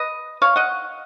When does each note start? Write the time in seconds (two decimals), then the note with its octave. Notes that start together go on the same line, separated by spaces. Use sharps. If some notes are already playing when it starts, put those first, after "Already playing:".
Already playing: B4 D#5
0.42 C#5 F5
0.56 D#5 F#5